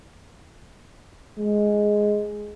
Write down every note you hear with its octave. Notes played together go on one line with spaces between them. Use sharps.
G#3